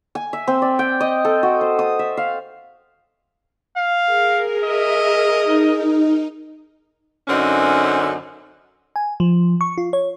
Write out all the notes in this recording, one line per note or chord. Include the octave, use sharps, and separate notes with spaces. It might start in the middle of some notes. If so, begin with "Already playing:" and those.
G#5
E5
C4
D5
G5
D#5
A4
F#4
C5
D#6
E5
F5
F5
G#4 A#4
D#5 E5
D#4
F#2 D3 C4 C#4 D#4
G#5
F3
C#6
F4
C#5